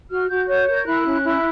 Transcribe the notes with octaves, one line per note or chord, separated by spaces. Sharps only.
F#4 F6
F#4 G6
C#5 G6
A#4 G6
E4 F#6
C#4
E4